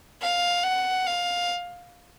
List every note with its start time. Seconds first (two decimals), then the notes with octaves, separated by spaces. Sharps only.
0.22 F5
0.64 F#5
1.07 F5